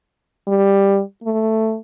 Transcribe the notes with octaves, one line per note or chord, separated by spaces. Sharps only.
G3
A3